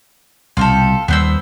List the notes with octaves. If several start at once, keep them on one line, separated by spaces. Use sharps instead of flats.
C2 B2 F4 G4 A4
D#2 G3 B3 C5 E6